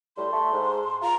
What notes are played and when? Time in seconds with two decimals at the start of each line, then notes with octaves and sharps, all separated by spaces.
0.17 A2 G3 C6
0.32 A3
0.52 G#2
1.02 F4 A#5